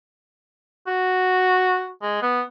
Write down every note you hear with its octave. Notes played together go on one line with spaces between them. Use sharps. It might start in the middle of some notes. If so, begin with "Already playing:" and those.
F#4
G#3
B3